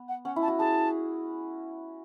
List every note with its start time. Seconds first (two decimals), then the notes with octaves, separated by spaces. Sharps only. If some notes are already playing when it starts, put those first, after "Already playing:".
Already playing: B3
0.08 F#5
0.25 C#4 F#5
0.36 E4
0.42 A5
0.48 F#4
0.59 G#4 A5